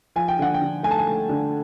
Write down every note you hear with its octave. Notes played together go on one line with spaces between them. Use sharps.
F3 G#5
G5
D3 F#5
G5
D3
A3 G#5
A5
G#5
A3
D3